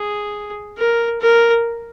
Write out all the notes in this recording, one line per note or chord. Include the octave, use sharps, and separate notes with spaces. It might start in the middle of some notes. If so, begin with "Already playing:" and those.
Already playing: G#4
A#4
A#4